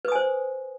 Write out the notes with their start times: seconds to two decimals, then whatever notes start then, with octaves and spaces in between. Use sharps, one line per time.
0.05 B4
0.08 D#6
0.12 G#5
0.15 C5